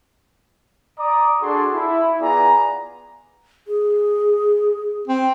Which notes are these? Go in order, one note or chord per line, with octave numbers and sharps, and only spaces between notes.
D5 A#5 D6 D#6
D4 F#4 G#4 A4 D5 C6
E4
B3 F4 G#4 D5 G#5 A#5
G#4
C4